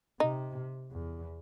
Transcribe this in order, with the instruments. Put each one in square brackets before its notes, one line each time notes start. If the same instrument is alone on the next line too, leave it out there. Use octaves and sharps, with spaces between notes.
[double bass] C3 [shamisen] D#4
[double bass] E2